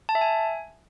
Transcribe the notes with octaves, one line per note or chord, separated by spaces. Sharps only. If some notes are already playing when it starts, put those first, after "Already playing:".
A5
E5
G#5